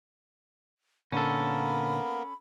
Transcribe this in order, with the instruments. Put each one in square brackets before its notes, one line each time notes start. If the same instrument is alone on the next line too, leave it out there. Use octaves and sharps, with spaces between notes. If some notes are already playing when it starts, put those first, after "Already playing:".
[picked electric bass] A#2 D3 [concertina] A#3 B3 A#4 [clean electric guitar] C#4 A4 [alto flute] B5